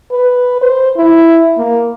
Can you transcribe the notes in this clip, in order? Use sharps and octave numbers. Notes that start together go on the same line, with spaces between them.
B4
C5
E4
A#3